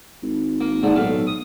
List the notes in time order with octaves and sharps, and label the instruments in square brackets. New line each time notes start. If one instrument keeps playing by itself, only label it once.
[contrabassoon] G#1
[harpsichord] A#3
[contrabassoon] G#2 [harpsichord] D3
[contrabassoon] B1 [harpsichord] A2 F5
[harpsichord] D#6